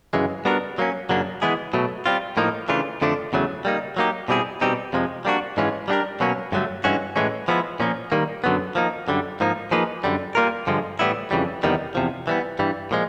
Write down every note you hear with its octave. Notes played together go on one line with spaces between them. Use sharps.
F#2 C#3 E3 G#3
G3 B3 D4 F#4 A#4
F#3 A#3 C#4
F#2 C#3 F#3 A#3 D4
E3 G#3 B3 E4 G#4
B2 F#3 A3
G3 C4 F4
A2 F3 A#3 D#4
C#3 E3 A3 D4 F4
F2 D3 F3 A3 D4
E2 C#3 F#3 A3
G3 A#3 D#4
F#3 A#3 D#4 G4
B2 G3 C4 E4 G#4
B2 G3 C4 D#4 G4
F2 C3 F3 G#3
G3 A#3 D4 F#4
G#2 E3 G#3 C#4 F4
G3 B3 D4 G4 A#4
B2 F#3 A#3 C#4
G2 D3 F#3 A3
G2 E3 G#3 C#4 F#4
A2 E3 G#3 C#4
F3 G#3 B3 E4
A#2 F3 A#3 C#4
D#3 G3 A#3
F#2 D3 F#3 B3
F3 A#3 D#4
F#2 D3 G3
G#2 F3 A#3 D#4
F3 A#3 D#4 G#4 B4
F#2 D3 G3
G3 A#3 C#4 F4 A#4
G2 D3 F3 G#3
A2 E3 G3 B3 E4
F2 C#3 E3 G3
E2 C3 D#3 G3 B3
E2 C3 F3
E3 G3 B3
G2 E3 G3
A#2 F3 G#3